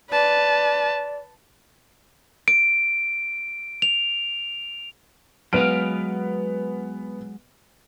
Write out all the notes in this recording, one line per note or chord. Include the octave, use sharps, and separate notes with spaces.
B4 D5 A5
D7
F7
F#3 G#3 B3 F5 F6 D7